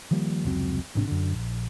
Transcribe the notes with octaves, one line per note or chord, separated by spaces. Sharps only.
D#3 F3 G3 A#3
F1 C#2 F#3 C4
A1 G#2 C3 D4
F#2 D3
A#1